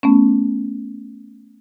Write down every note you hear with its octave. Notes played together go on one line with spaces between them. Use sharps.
A3 B3 C#4